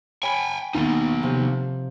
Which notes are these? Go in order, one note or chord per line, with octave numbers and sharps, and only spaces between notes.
C#5 G5 G#5 B5
D#2 B3 D#4
C3 F3